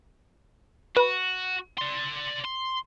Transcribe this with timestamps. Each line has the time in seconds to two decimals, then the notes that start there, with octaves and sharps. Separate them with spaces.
0.97 F#4 B4
1.78 D5 C6
2.45 C6